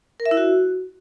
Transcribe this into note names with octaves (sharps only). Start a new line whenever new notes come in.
A#4
E5
E4
F#4